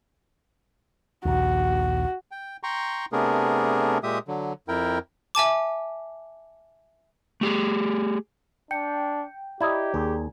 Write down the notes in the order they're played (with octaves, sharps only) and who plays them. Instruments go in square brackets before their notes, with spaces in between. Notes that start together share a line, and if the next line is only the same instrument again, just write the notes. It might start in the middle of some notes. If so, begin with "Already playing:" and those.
[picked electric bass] A#1 D#2 [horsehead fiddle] F#4
[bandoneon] G5
G5 A#5 C6 C#6
C3 A3 B3 D4 G#4 A#4
A#2 G#3 G4 E5 D#6
D3 F#3
F2 E4 A#4 G5
[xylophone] E5 G#5 A5 D6
[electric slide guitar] A3 G4 G#4
[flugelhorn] D4 [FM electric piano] G5 [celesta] C#7
[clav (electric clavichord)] E4 D#5 [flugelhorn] G4 [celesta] D5 A#5 G#6
[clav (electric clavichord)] D#2 [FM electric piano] G#4